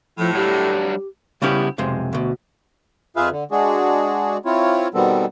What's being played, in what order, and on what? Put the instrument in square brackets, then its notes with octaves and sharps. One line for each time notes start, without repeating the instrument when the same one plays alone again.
[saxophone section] A2 [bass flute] F3
[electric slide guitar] F#3 G3 D4 [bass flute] G4
[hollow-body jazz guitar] C#3 G3 B3 C#4 E4 G4
B1 F2 C3 G#3
D2 B2
[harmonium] F2 F4 G#4 B4 E5 F5
D3
G#3 D4 F#4 G#4
C4 E4 F4 C#5
B2 D#3 G3 B3 C4 A4